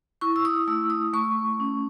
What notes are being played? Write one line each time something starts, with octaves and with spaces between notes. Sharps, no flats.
E4 C#6
E6
D#6
A3 E6
D#6
A3 C#6
C#4